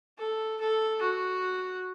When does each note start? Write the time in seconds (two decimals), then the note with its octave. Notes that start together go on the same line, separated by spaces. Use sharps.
0.19 A4
0.61 A4
1.02 F#4